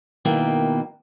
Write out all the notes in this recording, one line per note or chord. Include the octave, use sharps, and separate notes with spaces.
B2 D#3 A#3 E4 G5